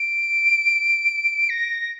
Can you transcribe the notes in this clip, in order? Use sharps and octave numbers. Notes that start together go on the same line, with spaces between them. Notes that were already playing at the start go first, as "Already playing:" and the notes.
Already playing: D7
A#6